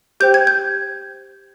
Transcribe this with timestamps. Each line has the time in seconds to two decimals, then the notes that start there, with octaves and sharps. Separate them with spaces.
0.20 G4 C5 G5 G6
0.34 G#6
0.47 G6